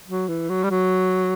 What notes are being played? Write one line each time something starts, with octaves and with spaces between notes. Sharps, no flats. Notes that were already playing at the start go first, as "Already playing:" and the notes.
F#3
E3
F#3
G3
F#3